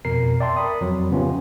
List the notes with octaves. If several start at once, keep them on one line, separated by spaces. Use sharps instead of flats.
F2 B2 A#4 C7
D5 E5 G5 A5 C6
A#4 B5 D#6
F2 F#3
C#3 F3 B3 C#4 F4 G4